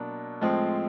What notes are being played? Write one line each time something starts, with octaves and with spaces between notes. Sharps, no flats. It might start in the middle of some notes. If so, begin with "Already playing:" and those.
Already playing: B2 F#3 A#3 D4
A2 F3 G#3 C4